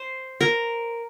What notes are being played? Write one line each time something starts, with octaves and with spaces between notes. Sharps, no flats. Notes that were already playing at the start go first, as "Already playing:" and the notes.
Already playing: C5
A#4